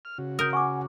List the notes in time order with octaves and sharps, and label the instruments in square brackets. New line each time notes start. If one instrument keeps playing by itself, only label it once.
[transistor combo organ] F6
C#3 F#4
[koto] A#4 [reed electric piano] D#6 G6
[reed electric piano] F#5 G#5 [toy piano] C#6 D6